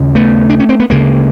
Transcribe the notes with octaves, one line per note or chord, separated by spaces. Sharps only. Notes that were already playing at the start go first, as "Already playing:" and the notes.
Already playing: D#2 C#3
A3 B3
D4
C#4
C4
B3
D2 C#3 G#3 A#3